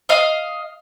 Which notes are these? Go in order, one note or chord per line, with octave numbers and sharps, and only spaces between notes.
D#5 F5